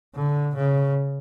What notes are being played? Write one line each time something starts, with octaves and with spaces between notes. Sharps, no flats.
D3
C#3